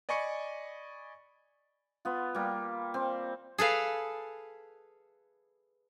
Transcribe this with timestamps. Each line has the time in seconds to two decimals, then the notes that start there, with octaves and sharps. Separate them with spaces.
0.09 D5 D#5 G#5 B5 C#6 C#7
2.05 B3 F4
2.35 G3 A#3
2.94 C4
3.58 G#4 A4 B4 F5